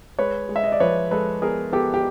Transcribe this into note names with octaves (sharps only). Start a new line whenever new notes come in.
G#3 B4 C#5
G#3
E5
D#5
D5
F3 B4 C#5
G#3 A4 B4
B3 G#4 A#4
B3 G4 A4
G4